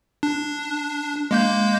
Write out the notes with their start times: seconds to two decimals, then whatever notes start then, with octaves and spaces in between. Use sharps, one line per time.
0.23 D4
1.31 G#3 A#3 G6